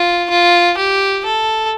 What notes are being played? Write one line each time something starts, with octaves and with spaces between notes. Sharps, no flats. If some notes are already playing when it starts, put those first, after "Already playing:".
Already playing: F4
F4
G4
A4